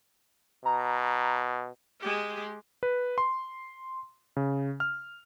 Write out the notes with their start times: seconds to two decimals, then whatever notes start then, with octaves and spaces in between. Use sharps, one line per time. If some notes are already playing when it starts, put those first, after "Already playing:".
0.65 B2 A#5
2.00 G#3 G4
2.83 B4
3.18 C6
4.37 C#3
4.80 F6